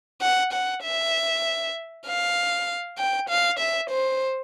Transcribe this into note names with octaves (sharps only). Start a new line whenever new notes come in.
F#5
F#5
E5
F5
G5
F5
E5
C5